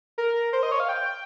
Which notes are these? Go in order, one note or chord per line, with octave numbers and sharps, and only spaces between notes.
A#4
C5
D#5
C#5
F5
G5